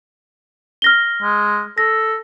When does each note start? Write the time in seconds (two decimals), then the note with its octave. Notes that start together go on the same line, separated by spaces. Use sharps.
0.82 F6 A#6 G7
1.22 G#3
1.78 A4 A#6